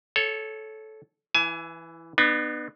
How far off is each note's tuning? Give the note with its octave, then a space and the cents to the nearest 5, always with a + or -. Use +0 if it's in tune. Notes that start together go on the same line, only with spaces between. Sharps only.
A4 -15 C#5 +0
E3 +0 E5 +45 G#5 +25
B3 +0 D4 +45